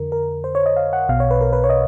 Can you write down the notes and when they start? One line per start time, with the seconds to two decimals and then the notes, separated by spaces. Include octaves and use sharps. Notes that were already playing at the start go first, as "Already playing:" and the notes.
Already playing: F2 D3 A#4
0.12 A#4
0.44 C5
0.55 C#5
0.66 D#5
0.76 F5
0.93 F#5
1.09 B1 B2 F5
1.20 C#5
1.31 B4
1.41 A#4
1.53 B4
1.64 C#5
1.70 D#5